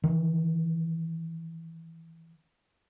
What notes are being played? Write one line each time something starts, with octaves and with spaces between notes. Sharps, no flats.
D#3 E3